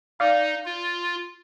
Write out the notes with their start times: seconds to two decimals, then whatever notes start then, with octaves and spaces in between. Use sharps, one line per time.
0.20 D#4 D5 F5
0.65 F4